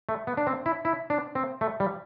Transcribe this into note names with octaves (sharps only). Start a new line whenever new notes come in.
A3
B3
D4
C4
E4
E4
D4
C4
A3
G3